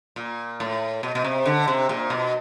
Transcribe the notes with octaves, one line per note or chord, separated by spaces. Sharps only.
A#2
A2
B2
B2
C3
D3
C3
A#2
B2